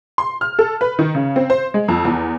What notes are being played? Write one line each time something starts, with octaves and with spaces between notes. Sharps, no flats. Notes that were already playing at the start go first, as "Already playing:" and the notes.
C6
F6
A4
B4
D#3
C#3
C4
C5
G#3
F2
E2